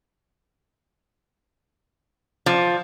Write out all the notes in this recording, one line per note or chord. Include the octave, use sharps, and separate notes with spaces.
F3